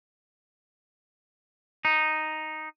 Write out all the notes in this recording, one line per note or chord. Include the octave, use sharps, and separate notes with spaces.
D#4